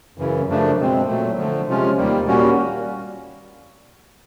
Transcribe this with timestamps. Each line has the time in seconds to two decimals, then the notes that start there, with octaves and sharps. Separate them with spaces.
0.18 F#2 C#3 E3
0.48 F#2 C#3 F3 A3 D4
0.78 B2 G#3 C4
1.07 A#2 F#3 A3
1.37 D3 F3 A3
1.67 C3 F3 G#3 C#4 F4
1.97 D#2 D#3 G3 A#3
2.27 A#2 G3 A#3 C#4 F#4